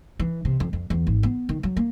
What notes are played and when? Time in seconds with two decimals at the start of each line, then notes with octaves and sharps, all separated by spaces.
0.19 E3
0.45 C3
0.60 F2
0.73 F2
0.90 E2
1.07 G#1
1.23 B3
1.49 D#3
1.63 F#3
1.77 A#3